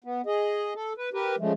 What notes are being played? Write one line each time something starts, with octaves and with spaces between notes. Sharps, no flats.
B3
G#4 D#5
A4
B4
G4 A#4 B4
C#3 F3 G#3 A3